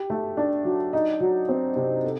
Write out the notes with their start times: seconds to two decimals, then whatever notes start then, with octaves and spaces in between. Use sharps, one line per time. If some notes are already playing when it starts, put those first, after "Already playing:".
Already playing: G4
0.10 A3
0.37 D4
0.65 F#3
0.93 D#4
1.20 F#3
1.48 C4
1.76 C3
2.04 A4